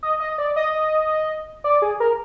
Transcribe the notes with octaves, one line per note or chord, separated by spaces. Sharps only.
D#5
D#5
D5
D#5
D5
G#4
A#4